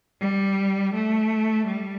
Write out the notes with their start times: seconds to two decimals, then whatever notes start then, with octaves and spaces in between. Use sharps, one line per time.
0.21 G3
0.94 A3
1.67 G3